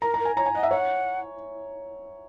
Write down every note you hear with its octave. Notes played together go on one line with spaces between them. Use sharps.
A#4 A#5
A#5
A#4
G#5
C#5 A#5
G#5
D#5 F#5
E5
C#5 F#5